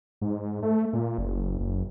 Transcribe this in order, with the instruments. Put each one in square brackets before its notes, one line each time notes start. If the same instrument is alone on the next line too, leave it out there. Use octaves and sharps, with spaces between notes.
[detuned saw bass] G#2
A3
A#2
F#1
F#1